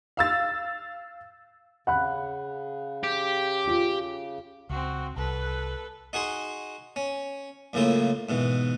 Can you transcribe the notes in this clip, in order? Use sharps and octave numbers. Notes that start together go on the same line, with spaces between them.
F5 E6 A6
C#3 F#5 B5 F#6
G4
F4
C#2 C4 F#4
C2 A4 B4
D#4 F#4 G#4 C6
C#4
F#2 A2 C#3 A#3 E4 F4
G#2 B2 E3